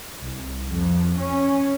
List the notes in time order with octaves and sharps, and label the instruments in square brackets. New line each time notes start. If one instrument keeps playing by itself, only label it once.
[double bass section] C2
F2
C#4